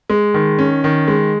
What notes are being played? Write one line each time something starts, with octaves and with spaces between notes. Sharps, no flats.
G#3
D#3
C#4
D#3
G#3